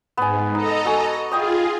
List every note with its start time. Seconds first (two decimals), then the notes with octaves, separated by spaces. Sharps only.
0.17 G#2 B3 G#5
0.55 D#4 A4 D#5 A#5
0.85 F#4 G#5
1.31 F4 G#4 D#5 G5 D#6